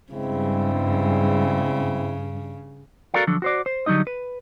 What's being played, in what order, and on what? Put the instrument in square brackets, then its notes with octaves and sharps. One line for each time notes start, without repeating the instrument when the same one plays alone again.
[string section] G2 [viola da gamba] C#3 [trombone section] G#3 C4 E4
[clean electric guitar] F#4 A4 A#4 D5 F5
D3 F3 F#3
F#4 C5 D5
C5
D3 F#3 G3 D#4 D#5
B4